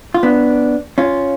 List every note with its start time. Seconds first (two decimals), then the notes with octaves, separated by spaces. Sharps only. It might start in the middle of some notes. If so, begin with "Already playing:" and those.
0.14 F4
0.23 B3 D4
0.98 C#4 F4